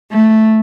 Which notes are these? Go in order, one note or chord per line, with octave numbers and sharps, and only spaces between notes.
A3